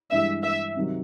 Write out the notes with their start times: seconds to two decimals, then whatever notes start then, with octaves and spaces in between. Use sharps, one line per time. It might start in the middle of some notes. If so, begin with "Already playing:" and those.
0.11 G2 E3 G#3 E5
0.43 E5
0.76 C3 D#3 F#3